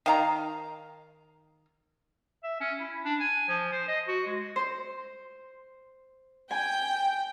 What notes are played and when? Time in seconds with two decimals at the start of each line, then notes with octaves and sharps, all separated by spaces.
0.06 D#3 F5 A#5
2.43 E5
2.61 C#4
2.80 E4
3.05 D4
3.20 G#5
3.49 F3
3.72 C5
3.88 D#5
4.08 F#4
4.26 G#3
4.56 C5
6.51 G5 G#5